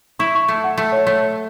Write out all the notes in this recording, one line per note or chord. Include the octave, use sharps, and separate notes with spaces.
E4 C#6
C#6
A3
F#5
A3
C#5
A3 C#5